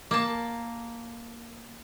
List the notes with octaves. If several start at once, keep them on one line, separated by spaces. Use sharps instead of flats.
A#3 A5